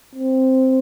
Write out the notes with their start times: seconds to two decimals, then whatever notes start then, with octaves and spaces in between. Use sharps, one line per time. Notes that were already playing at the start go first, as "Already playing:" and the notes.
0.15 C4